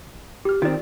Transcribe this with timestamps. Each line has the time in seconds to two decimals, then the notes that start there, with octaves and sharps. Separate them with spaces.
0.45 G4 F6
0.62 D#3 C4 F4 D5